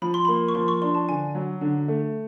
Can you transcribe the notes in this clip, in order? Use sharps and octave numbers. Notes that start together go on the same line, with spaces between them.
F3 B5
C6
A#3 B5
C#6
F3 C6
C#6
D4 C6
A5
D3 G#5
F#3
D3
A3